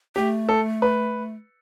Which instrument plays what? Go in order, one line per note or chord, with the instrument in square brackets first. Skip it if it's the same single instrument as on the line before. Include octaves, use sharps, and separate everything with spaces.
[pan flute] A3 [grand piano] G4
[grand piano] A4
B4